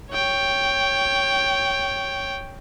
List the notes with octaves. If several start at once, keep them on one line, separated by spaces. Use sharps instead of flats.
C#5 G5